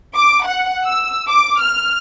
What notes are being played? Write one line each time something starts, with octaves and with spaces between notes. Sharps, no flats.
D6
F#5
E6
D6
F6